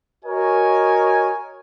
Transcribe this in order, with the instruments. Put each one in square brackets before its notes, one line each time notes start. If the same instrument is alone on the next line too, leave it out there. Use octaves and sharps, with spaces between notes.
[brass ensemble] F#4 A#4 C#5 D#5 G#5